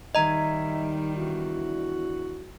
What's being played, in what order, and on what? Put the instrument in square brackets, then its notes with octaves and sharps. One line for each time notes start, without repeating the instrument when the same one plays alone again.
[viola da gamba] D#3 G3 [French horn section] D#4 [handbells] D#5 A#5 [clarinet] E5
[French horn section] E2 D4 E4 [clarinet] F#4